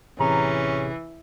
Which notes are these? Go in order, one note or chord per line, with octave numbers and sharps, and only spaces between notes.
A1 C3 E3 C#4 G#4 A#5